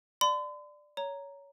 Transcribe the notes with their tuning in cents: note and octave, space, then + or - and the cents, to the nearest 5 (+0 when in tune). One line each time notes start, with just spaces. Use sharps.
D5 +10 C6 -45
C#5 +20 A#5 +0